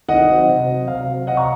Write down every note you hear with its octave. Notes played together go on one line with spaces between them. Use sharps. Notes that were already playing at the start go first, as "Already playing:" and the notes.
D#3 D#5 F#5
F#3 C4
C3
F#3 C4
C3 F5
F#3 C4
C3 D#5 F#5
A#5 C#6